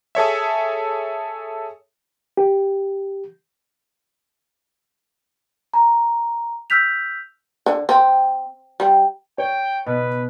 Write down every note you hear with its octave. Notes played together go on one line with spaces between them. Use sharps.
G#4 A4 C#5 E5
G4
A#5
E6 F6 G6 B6 F7
D3
C4
G3
C#5 G5
B2 B4